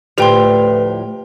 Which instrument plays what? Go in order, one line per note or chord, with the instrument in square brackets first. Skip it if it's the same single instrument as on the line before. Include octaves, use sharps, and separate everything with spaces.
[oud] D2 A2 F3 [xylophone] G4 G5 C6 [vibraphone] B4